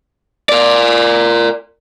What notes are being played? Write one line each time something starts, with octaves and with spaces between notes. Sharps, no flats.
A#4 D5